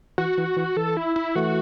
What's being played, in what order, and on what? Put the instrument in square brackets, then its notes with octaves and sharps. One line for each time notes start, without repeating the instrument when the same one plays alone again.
[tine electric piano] E3 [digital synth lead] F#4
[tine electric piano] E3
E3
[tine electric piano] E3 [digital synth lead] A4
[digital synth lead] E4
E4
[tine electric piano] E3 A3 [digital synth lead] F#4